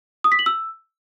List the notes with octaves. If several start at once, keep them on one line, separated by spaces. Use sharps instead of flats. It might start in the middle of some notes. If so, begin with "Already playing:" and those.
D#6
B6
F#7
E6